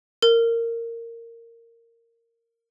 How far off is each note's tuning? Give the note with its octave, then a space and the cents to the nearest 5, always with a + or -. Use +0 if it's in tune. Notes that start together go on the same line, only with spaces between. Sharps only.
A#4 -15